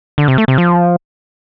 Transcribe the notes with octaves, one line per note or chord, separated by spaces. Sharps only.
D3
C3
A3
C3
F3